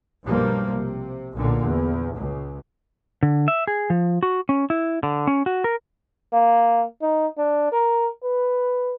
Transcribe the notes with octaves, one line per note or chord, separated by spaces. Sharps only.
B1 G2 F3 G3 A#3
C3
B1 A#2 D3
E2
C#2
D3
E5
G#4
F3
F#4
C#4
E4
D3
C#4
F#4
A#4
A#3
D#4
D4
A#4
B4